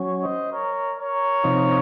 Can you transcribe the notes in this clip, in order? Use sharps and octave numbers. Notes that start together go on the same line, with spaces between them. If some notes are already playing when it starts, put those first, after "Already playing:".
Already playing: F#3 C#4
C5 D#5
A#4 C#5
A#4 C#5
C3 F3 C4 D#4